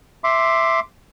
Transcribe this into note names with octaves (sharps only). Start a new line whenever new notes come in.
E5 C6 D6